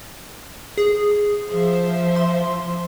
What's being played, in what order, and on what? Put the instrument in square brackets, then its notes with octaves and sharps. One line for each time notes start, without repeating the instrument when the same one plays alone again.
[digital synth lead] G#4
[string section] F3 C5 E5
[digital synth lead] C6